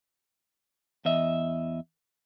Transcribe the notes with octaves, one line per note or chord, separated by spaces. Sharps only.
E2 D#5 E5